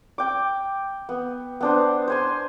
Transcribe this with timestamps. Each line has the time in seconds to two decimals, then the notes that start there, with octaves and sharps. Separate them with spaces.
0.18 G5 D6
1.09 B3
1.61 B3 D4 C5
2.08 C5 G#5 C6